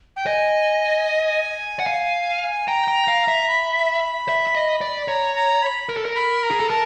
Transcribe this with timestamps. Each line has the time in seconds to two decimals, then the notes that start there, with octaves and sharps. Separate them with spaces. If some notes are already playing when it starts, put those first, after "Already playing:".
0.16 G5
0.26 D#5 G#5
1.79 F#5
1.87 F5
2.67 G5 A#5
2.88 G5
3.08 F5
3.28 E5
3.48 B5
4.29 E5
4.47 E5
4.55 D#5
4.81 D5
5.08 C#5 A#5
5.35 A#5
5.63 B5
5.89 A#4
5.97 A4
6.05 A#4
6.16 B5
6.43 A#5
6.51 G#4
6.60 A4
6.69 A#4 A5